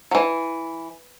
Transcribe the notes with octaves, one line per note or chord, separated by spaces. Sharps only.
E3 F#3